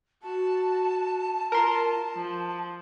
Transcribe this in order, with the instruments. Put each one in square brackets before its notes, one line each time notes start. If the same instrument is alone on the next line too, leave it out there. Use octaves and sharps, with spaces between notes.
[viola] F#4 [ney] A5
[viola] F4 [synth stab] A#4 C6
[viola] F3